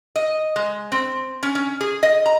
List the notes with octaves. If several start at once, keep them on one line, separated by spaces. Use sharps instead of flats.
D#5
G#3
C4
C#4
C#4
G#4
D#5
A#5